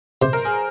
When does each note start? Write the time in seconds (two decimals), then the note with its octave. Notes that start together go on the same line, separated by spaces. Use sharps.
0.22 C3 C5
0.33 A#4
0.45 G#4